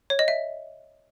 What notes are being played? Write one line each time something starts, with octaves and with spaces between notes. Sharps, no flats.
C#5
D#5
E5